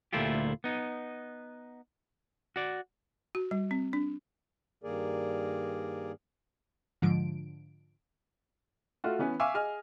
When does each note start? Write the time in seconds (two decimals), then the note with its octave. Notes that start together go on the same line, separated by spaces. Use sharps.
0.13 D2 A#2 A3 E4 F4 G4
0.64 B3 D#4
2.56 F#4 D5
3.35 F#4
3.51 G3
3.71 C4
3.93 D4
4.84 G2 D#3 A#3 G#4 A#4 D5
7.02 G#2 D3 F3 D7
9.04 A3 F4 F#4
9.19 E3 B3 C#4 B4
9.40 E5 F5 G#5 C#6 D6 E6
9.54 G#4 D#5 G#5 F6